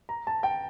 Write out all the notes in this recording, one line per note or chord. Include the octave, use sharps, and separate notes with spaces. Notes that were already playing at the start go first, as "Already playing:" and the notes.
A#5
A5
G5